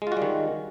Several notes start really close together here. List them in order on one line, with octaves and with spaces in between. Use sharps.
G#3 F4 F#4 G3 D#3